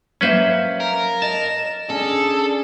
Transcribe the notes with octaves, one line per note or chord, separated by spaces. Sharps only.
F#3 A#3 C#4 B4 C5 E5
A#4
D#5 A5 E7
C#4 D4 G#4 A4